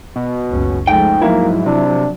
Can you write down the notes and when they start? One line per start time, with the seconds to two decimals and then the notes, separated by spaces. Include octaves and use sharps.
0.16 B2
0.49 F#1 C#2 C#4
0.87 G#2 F3 G#3 A3 G5
1.22 F3 F#3 A#3 E4
1.66 C3 D4